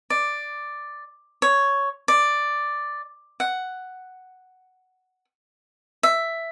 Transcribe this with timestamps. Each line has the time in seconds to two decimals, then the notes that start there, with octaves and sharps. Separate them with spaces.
0.10 D5
1.42 C#5
2.08 D5
3.40 F#5
6.03 E5